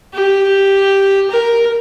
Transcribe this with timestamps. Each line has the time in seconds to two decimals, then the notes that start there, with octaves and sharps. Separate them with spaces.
0.14 G4
1.31 A#4